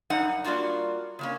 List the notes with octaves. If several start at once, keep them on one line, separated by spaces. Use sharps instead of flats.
F#2 G3 D#4 F#5
G3 A#3 D4 F4 F#4
C#3 A#3 C#4